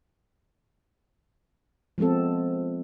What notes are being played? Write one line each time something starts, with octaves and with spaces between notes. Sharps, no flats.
F3 G#3 B3 C4 A4